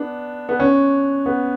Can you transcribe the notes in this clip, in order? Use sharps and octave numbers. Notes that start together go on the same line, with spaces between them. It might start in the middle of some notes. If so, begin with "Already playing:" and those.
Already playing: B3 D4
B3
C#4
B3